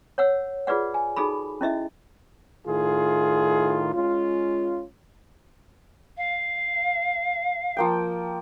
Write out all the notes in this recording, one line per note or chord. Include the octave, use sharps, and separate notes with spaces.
C#5 F#5 E6
F4 G#4 B4 D5 F#5
G#5
D#4 F#4 G#4 A4 B5
C#4 E4 D#5 E5
A2 D#3 F4 G#4
G#3 C#4 F4
F5
F3 A#3 G5